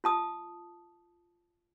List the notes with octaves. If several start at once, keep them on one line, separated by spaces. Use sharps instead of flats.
F4 A5 D#6